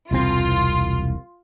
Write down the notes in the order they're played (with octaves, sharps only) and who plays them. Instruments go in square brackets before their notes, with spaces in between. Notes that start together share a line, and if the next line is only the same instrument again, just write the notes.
[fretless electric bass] E1 C2 C4 [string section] F4